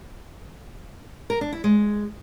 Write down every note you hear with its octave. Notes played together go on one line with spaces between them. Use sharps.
A#4
D4
E4
G#3